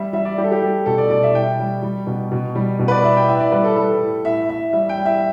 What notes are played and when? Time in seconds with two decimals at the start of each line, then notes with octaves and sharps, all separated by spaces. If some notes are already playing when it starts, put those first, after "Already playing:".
Already playing: G3 E5
0.13 G3 E5
0.25 D5
0.38 G3 G4
0.44 A4
0.52 G4
0.62 G3
0.86 B2 A4
0.98 D5
1.10 B2 D5
1.23 E5
1.34 G3 G5
1.59 G3
1.83 G3
2.07 B2
2.32 B2
2.55 G3
2.79 B2
2.88 B4
2.91 D5
3.04 B2 E5
3.17 G5
3.28 A2 E5
3.40 D5
3.52 G3 B4
3.64 A4
3.76 G3 A4
4.01 A2
4.25 A2 E5
4.49 A2 E5
4.73 G3 E5
4.89 G5
4.97 G3
5.06 E5